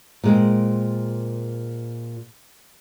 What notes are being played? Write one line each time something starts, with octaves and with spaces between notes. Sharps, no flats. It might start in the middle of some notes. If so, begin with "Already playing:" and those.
A#2 G#3 C4